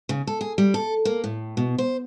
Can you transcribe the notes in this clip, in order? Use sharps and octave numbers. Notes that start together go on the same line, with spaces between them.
C#3
A4
G#4
G3
A4
A#3
A2
B2
C5